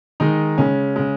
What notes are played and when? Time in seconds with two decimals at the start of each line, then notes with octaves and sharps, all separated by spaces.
0.20 D#3 G#3 D#4
0.58 C#3 G#3 C#4
0.96 C#3 G#3